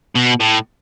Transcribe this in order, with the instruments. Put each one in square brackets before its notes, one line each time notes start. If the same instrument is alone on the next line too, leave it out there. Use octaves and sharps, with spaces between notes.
[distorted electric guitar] B2
A2